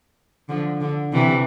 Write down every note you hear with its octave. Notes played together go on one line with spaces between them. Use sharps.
D3 F3
D3
C3 E3